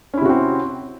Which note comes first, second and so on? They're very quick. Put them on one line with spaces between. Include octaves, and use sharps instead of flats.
C#4 E4 C3 F#4 C4